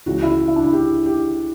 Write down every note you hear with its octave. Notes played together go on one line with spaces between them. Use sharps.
C#2 C#3 E3 F#4
E4
E4
D4
E4
G4
G4